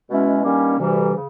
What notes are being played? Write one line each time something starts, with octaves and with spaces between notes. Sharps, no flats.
B2 G#3 C#4 E4
G2 D#3 G3 A#3 C#4
D2 C3 E3 G3
C#3